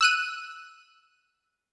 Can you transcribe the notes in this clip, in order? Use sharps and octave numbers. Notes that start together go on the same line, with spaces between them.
E6 F#6 D#7